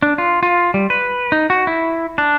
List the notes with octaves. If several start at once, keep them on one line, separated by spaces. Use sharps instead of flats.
D4
F4
F4
G3
B4
D#4
F#4
E4
D4